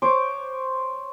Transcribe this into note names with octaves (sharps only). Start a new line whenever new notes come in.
C5 C#5 D6